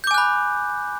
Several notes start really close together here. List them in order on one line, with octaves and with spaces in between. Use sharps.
G6 D6 G#5 F#6 B5